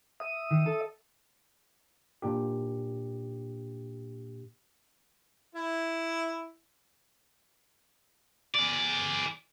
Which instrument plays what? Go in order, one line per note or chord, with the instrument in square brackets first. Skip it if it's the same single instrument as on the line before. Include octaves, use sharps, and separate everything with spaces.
[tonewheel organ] E5 D#6
[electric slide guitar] D#3
A4
[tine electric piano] A#2 D4 G4
[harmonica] E4
[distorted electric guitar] G#4 D5